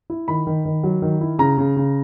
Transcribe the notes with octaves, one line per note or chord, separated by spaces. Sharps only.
E4
D#3 B5
D#3
D#3
F#3
D#3
E4
C#3 A#5
C#3
C#3